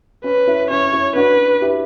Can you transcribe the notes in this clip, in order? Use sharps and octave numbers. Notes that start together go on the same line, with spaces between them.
C#4 B4
C#4 E4
C#4 C#5
C#4 E4
D4 F#4 B4
E4 G4